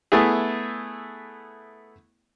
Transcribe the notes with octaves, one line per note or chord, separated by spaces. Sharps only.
A3 B3 E4 G#4